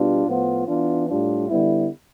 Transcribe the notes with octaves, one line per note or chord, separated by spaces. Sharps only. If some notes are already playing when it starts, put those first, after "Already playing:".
Already playing: B2 G3 D4 F4
A2 F3 B3 F4
E3 B3 D4 F4
A2 G3 D4 F4
D3 G3 B3 E4